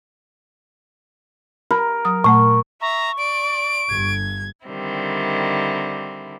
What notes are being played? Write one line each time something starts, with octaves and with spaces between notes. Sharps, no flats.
A#4 B5
F#3 D#6
A#2 A3 F#5 C#6
E5 A#5 C#6
D5 D7
G1 G#6
D3 D#3 G3 C4 E4